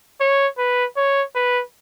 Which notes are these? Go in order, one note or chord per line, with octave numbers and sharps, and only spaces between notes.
C#5
B4
C#5
B4